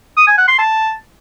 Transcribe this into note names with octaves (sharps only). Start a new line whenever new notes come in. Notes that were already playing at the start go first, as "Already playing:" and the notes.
D#6
G#5
F#5
C6
A5